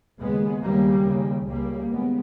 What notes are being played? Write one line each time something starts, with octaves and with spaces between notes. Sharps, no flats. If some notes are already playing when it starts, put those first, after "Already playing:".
D#2 C#3 G#3 B3
D#2 C#3 G3 A#3
D#2 C#3
C#2 C#3 G3 A#3
D#2 C#3 G#3 B3